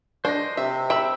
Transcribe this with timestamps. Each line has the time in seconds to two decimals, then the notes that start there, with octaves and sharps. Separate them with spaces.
0.25 D4 C5 D#5
0.57 C3 E5
0.90 E5 G5 B5 E6